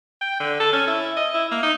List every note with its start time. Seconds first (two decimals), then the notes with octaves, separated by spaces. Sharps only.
0.22 G5
0.40 D3
0.60 A4
0.73 C#4
0.88 E4
1.17 D#5
1.34 E4
1.51 A#3
1.63 D#4